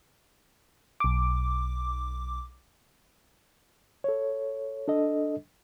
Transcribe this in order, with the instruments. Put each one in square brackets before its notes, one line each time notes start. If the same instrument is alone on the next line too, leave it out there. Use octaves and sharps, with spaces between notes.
[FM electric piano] B1 D6
[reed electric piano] A4 C#5
D4 A4 D#5